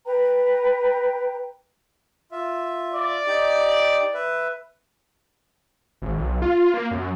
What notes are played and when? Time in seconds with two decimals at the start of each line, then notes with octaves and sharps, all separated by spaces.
0.04 B4 G5 A#5
2.31 F4 E5
2.93 D5
3.27 D#4 G4
4.14 B4 E5
6.02 G#1
6.18 B1
6.42 F4
6.74 A#3
6.91 F#2